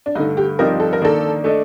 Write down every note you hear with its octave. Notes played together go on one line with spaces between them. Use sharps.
D4
G2 D3 A3 D#4
G4
G2 F3 C4 D#4 G4 A#4
A4
A#4
D#3 A#3 D4 A4
A3 D4 A4 D#5